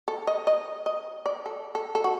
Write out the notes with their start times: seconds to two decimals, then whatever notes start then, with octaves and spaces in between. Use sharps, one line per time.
0.08 A4
0.27 D#5
0.47 D#5
0.86 D#5
1.26 D5
1.46 A4
1.75 A4
1.95 A4
2.04 F#4